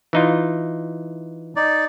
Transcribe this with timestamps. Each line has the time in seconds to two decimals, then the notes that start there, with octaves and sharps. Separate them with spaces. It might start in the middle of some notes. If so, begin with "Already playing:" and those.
0.13 E3 D#4 F4
1.56 D#4 D5